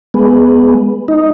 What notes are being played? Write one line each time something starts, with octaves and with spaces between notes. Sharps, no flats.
G#3 B3
D#4